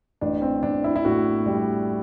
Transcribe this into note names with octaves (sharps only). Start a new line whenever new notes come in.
A1 D4
C4
A1 D4
E4
E4
A2 F#4
G3